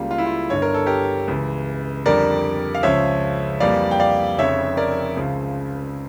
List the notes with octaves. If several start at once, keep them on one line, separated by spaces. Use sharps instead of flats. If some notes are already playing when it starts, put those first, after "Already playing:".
Already playing: C#2 C#3 G3 A#3 F4
F4
E4
F4
G1 G2 D3 C#5
A#4
A4
G4 A#4
C#2 C#3 E3
F2 D3 G3 A#4 D5
F5
C#2 C#3 F3 C#5 E5
F2 E3 G3 A#3 D5 F5
G5
D5 F5
F1 F2 C#3 C#5 E5
A#4 D5
C#2 C#3 F3